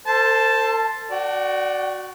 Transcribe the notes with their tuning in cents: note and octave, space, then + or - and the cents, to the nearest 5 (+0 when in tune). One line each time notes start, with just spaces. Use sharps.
A4 +40 C5 +0 A5 +0
F#4 +0 D5 +0 G5 -45